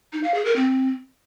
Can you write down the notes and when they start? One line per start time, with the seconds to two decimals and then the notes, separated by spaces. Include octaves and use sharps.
0.13 D#4
0.24 F5
0.34 G#4
0.45 A#4
0.56 C4